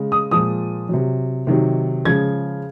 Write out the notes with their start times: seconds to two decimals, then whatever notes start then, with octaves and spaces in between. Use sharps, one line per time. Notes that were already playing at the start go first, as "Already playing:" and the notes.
Already playing: C#3 G#3
0.12 D#6
0.31 A#2 F3 G#3 D#6
0.89 C3 F#3
1.47 C3 D#3 F#3
2.05 C#3 F3 G#3 G#6